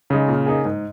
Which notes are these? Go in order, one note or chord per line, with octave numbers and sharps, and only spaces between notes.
C#3 G#3 D#4 G#4
A#2
A#3 D#4 G#4
G#2